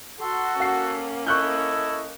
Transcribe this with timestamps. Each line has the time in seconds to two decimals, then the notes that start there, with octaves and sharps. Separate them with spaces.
0.21 F#4 A4 C6
0.60 A#3 C#4 F#5 C7
1.27 E4 A4 D#5 C#6 F#6 G6